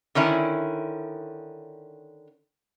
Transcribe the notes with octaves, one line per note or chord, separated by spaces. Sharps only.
D3 D#3 C#4 E4